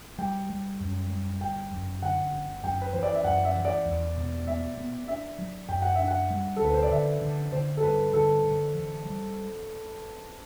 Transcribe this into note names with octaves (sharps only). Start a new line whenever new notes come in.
G3 G5
G3
F#2
G3
G1 G5
F#2
D3 F#5
G1
F#2 G5
B4
E3 C5
D5
E5
F#2 F#5
E5
E3
D5
E2
B2
B3 E5
B3
D4 E5
F#3
F#2 G5
F#5
D4 E5
F#5
G3
A4
D2 B4
C5
D5
D3 E5
D3
D3 C5
A4
G2 B4
D3 A4
D3
E3
G3